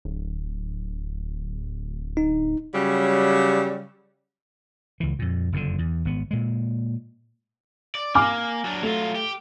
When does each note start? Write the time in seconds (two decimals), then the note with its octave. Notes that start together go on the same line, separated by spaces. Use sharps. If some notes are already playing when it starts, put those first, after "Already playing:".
0.05 D1
2.17 D#4
2.74 C#3 F#3 G3
5.00 C#2 E3
5.19 F2 A#2
5.52 F#1 F2 B2 D3
5.78 E2
6.05 G#1 B3
6.31 A#2 G#3
7.95 D5
8.15 A#3 G#5 D6 F6
8.64 F#3 D4
8.83 F#3 A3 F4
9.16 G4